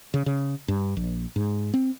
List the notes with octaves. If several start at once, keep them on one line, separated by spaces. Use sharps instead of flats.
C#3
C#3
G2
A#1
G#2
C4